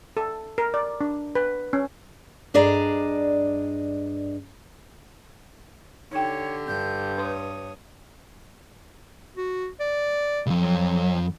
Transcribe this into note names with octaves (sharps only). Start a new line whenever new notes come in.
A4
A#4
D5
D4
B4
C#4
G2 D4 G#4 D5 D#5 A#5
D3 D#4 G4 C#5 G5
G2 G6
B4 C#5 C6 D#6
F#4
D5
C2 F2
F#3